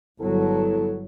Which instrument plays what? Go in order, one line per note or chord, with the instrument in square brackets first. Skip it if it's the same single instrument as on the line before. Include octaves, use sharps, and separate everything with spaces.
[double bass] G1 F#3 [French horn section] B3 E4 A4